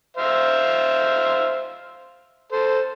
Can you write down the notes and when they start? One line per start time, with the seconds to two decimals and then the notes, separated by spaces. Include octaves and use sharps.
0.17 C5 E5 F5
2.52 A4 C5